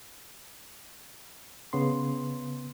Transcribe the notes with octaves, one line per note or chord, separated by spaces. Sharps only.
C#3 B3 C6